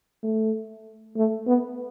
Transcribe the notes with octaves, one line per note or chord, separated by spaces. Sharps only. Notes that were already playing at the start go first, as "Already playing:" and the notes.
A3
A3
B3